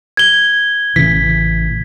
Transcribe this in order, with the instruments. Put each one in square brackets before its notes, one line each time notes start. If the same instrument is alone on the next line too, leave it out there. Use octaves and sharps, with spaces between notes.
[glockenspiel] G#6 G7
[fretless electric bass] A1 C#3 E3 [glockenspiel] B6